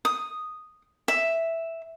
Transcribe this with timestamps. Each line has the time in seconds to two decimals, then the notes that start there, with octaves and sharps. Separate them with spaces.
0.05 D#6
1.08 E5